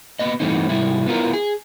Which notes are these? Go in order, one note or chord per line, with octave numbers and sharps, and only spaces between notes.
A#3 B3 D#5
G2 E3 A3 C4 D#4
G#2 C3 G3 E4
B3 E4 F4 A#4
G#4